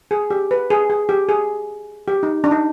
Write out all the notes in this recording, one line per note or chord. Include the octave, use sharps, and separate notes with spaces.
G#4
G4
B4
G#4
G#4
G4
G#4
G4
D#4
D4
D#4